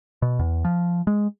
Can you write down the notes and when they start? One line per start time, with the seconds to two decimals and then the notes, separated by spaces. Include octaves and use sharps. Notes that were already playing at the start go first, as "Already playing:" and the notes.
0.22 B2
0.39 E2
0.65 F3
1.07 G#3